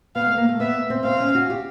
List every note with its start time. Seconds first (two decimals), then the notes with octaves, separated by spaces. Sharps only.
0.16 B3 F5
0.27 A3
0.38 A#3
0.49 A3
0.60 B3 E5
0.90 C4
1.05 C4 F5
1.20 C#4
1.35 F#4
1.50 G4